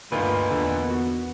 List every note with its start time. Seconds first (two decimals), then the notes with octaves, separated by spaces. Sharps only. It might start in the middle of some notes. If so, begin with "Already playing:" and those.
0.12 D2 G2 A#2 D#4 F4 B4
0.51 E2 D3 B3
0.90 F#4